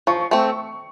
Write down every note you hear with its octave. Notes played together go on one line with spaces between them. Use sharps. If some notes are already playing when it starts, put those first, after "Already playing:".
F3 C#6
A3 C4